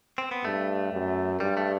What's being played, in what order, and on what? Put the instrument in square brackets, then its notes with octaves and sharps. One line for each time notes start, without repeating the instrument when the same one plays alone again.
[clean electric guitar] C4
B3
[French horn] G2 [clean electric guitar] A3
[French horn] F#2
[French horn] G2 [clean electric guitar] G3
[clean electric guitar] A3